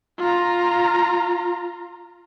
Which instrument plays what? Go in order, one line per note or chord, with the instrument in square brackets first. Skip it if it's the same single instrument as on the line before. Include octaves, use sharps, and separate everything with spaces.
[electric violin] F4 A#5